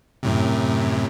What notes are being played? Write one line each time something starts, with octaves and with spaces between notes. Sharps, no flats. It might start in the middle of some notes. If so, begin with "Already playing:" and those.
F#2 A2 C3